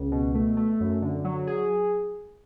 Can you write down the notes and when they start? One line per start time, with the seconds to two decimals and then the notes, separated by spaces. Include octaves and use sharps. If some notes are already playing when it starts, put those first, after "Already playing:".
Already playing: C#2
0.11 B2
0.34 A3
0.57 A3
0.80 F#2
1.02 D3
1.24 F#3
1.47 G#4